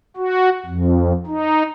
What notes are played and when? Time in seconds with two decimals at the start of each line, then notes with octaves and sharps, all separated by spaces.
0.17 F#4
0.66 F2
1.27 D#4